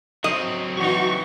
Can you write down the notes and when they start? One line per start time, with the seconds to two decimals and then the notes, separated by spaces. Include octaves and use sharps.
0.24 F#3 C4 D#5
0.77 E3 D#4 F#4 C#6